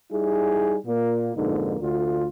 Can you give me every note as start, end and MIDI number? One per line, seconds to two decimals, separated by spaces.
0.11 0.76 55
0.11 0.76 63
0.11 0.76 64
0.11 0.76 68
0.86 1.31 46
0.86 1.31 58
1.36 1.76 41
1.36 1.76 44
1.36 1.76 47
1.36 1.76 50
1.36 1.76 58
1.36 1.76 63
1.81 2.25 38
1.81 2.25 50
1.81 2.25 65